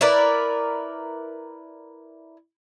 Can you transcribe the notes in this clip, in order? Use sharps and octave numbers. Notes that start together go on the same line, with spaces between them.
E4 A#4 B4 D5